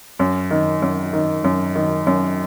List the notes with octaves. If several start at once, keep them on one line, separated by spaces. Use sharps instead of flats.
F#2
D#3
F#2
D#3
F#2
D#3
F#2